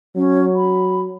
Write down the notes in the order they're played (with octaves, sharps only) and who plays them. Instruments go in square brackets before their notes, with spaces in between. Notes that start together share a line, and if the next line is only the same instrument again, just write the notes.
[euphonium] F#3 [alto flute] C#4
[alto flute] B5